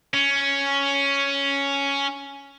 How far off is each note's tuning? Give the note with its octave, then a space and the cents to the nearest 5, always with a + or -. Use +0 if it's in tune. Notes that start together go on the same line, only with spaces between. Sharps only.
C#4 +5